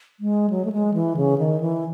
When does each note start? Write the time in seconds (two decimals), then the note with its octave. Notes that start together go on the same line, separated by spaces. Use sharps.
0.20 G#3
0.50 F#3
0.65 A3
0.72 G#3
0.94 E3
1.17 C#3
1.38 D#3
1.60 E3